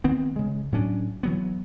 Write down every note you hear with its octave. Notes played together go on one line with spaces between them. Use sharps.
D#3 B3 C4
C#3 G#3
A2 F#3 C#4 D4
E3 F#3 B3